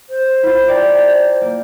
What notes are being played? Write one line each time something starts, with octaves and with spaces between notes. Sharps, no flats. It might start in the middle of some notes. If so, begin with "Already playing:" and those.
C5
E4 F4
D5 G5 A#5
A#3